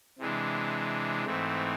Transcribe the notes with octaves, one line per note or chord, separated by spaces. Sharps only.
C3 E3 G#3 D4
G#2 E3 A3 C4